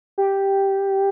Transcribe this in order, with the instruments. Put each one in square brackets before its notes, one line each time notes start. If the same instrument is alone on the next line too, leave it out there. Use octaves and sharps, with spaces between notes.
[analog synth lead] G4